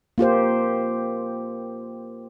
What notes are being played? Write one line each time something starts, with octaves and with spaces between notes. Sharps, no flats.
A#3 F4 G4 C5